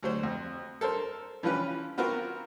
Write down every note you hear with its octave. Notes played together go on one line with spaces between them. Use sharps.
D2 F#3 C5
F2
A4 A#4 C5 C6
E3 F3 G3 C#4 F4 B4
B3 C4 F4 F#4 A#4